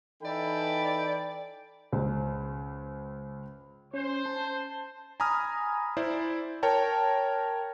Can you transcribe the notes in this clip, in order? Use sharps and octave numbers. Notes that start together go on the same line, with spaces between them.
E3 D#4 A4 D5 G5 B5
C#2 C5
C#4 C5
A5
G#5 A#5 B5 D#6 F6
E4 C5 D5
A#4 C#5 G5 A5